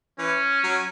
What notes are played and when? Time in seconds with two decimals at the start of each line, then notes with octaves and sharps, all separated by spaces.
0.19 E3 C#4
0.64 F#3